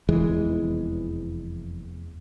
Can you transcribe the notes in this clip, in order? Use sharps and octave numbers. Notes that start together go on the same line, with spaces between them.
F1 E2 E3 G#3